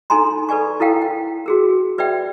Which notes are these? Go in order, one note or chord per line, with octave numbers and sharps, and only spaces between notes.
D4 D#4 A4 G#5 A#5 C6
A4 B4 D5 G#5 C#6
E4 A4 A#4 F5 G5
G5
F#4 G#4 A#4
B4 D5 E5 G5